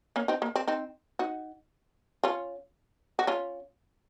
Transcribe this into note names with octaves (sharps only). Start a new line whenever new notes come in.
A#3 C#4
C4 D#4
A#3
C4
C4 D#4
D#4 F#4
C#4 F4
F#4
C#4 F4